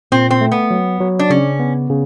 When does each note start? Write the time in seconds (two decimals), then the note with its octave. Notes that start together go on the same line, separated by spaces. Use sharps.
0.12 A#2 C4
0.31 C4
0.41 A3
0.52 B3
0.71 F#3
1.00 F#3
1.19 D4
1.30 C#3 C#4
1.60 B3
1.90 C#3